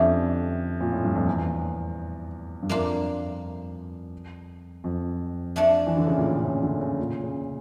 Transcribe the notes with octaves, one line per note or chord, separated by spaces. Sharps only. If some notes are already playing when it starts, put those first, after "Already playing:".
Already playing: F2 D3 F3 C#4 E4 G4
A#2
A2
G2
F2
E2
G2
F2 A#3 D4 F4
F2
F3 A3 D4 A4 D5
E3
D3
C#3
A#2
A2
C#3
D3
C#3
A#2
C#3